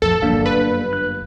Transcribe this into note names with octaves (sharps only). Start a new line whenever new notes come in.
F2 A#2 A4
G1 F#2 A#3 D4 F5
B4
F#6